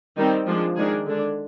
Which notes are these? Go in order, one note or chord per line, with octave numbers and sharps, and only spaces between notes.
D#3 G3 C4 D#4
F3 G#3 D4 F4
D#3 G#3 D4 G#4
D3 G#3 D4